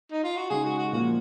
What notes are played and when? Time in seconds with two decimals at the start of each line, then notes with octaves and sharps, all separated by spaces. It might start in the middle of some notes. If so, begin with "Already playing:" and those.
0.11 D#4
0.24 F4
0.37 F#4
0.50 C#3 G#3 D#4 G#4
0.64 F#4
0.78 F#4
0.92 A#2 F3 A#3 F4 F#4